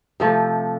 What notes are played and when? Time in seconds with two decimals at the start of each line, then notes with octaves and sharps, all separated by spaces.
0.20 C3 F3 A3